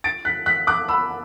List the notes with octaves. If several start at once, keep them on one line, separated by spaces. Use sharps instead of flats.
A6 D7
F#6 B6
F#6 B6
D6 F#6
B5 E6